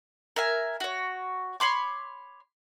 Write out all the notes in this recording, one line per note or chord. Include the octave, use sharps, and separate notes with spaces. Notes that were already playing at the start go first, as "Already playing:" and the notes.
A#4 E5 G#5
F#4 C#5
C#5 B5 C6 D6